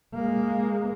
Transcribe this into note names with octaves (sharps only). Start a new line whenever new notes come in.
G#3 A#3